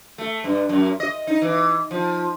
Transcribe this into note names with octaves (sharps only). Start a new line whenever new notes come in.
A3
G2
F#2
D#5
D#4
E3
F3